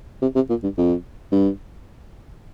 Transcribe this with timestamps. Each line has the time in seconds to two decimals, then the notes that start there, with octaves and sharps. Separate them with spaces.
0.22 C3
0.36 C3
0.50 A#2
0.63 G2
0.77 F2
1.32 G2